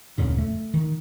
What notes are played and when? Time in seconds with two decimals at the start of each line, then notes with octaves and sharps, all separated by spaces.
0.18 D1 F2 A#2 C#3
0.38 A3
0.74 D#3